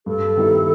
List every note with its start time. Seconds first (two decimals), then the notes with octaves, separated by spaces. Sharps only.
0.06 G2 A4
0.37 D#3 G3 B3 E4